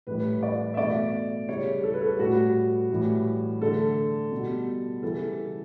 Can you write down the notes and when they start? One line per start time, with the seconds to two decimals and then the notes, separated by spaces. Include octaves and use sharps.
0.07 A2 E3 G3 B4
0.43 D5
0.74 E5
0.77 B2 A3 D5
1.49 C#3 G3 C#5
1.83 A4
1.93 B4
2.01 A4
2.19 A2 G3 F#4
2.89 A2 E3 G3
3.61 D3 A3 A4
4.31 B2
4.36 G3
5.03 C#3 E3 G3 A4